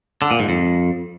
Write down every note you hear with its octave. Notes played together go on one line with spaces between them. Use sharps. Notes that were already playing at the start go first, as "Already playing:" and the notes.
D3
A#2
G#2
F2